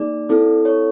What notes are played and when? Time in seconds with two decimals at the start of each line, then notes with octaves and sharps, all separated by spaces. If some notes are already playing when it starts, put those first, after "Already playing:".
Already playing: A#3 D#4 G#4 D5
0.29 C4 E4 A4
0.65 C#5